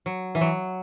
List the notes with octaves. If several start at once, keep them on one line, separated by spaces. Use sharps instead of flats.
F#3
E3
F#3